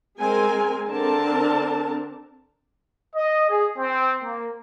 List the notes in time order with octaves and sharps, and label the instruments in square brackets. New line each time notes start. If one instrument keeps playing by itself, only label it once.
[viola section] G#3 C4 A#4 G#5
D3 C4 D4 A#4 A5
[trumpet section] D#5
G#4
C4
A#3